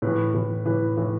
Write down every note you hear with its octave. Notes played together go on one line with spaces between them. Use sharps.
A2 E3 B4
A2 E3
A2 E3 B4
A2 E3